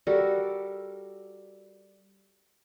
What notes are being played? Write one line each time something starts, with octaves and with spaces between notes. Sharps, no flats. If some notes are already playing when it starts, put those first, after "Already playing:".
G3 F#4 A4 A#4